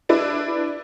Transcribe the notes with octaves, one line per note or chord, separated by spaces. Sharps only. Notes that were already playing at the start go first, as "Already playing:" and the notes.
D4 E4 B4